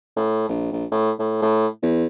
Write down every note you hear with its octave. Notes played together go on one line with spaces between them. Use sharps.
A2
A#1
A#1
A2
A2
A2
E2